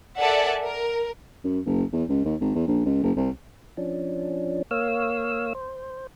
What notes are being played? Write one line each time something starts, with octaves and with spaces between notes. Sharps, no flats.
A4 A#4 D5 E5 F#5 G#5
A#4
F#2
F#1
E2
C#2
D#2
G#1
E2
A#1
C#2
F#1
C2
F3 C#4 D4
A#3 C#5 F5 E6
C5